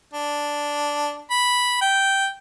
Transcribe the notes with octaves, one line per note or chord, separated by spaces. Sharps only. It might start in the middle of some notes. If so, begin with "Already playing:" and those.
D4
B5
G5